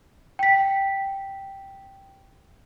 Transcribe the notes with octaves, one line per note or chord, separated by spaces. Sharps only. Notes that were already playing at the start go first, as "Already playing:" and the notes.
G5 B6